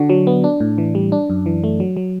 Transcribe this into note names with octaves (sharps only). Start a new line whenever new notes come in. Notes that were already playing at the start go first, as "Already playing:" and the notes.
Already playing: D3 D4 F#4
F#3
B3
D4
A2
E3
G3
D4
F#2
E3
A3
F#3
F#3